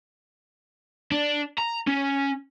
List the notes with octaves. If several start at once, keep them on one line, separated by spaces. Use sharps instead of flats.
D4
A#5
C#4